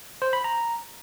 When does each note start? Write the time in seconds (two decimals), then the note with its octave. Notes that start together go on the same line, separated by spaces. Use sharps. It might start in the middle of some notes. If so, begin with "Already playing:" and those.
0.22 C5
0.33 B5
0.44 A#5